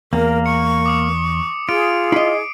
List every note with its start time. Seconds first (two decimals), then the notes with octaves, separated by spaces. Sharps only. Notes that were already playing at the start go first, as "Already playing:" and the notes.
0.13 E2 A#3 A#4
0.46 C#6 C#7
0.86 D6 D#6 C#7
1.69 F4 G#4 D7
2.12 E4 D#5 C7